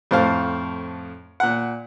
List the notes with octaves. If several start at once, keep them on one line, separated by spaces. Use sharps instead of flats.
F2 A2 C5 F5 A5
A#2 F#5